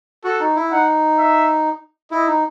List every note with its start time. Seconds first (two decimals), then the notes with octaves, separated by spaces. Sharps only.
0.24 F#4 A4
0.40 D#4
0.56 E4
0.71 D#4 F#5
1.18 E5
2.11 E4 D#5
2.27 D#4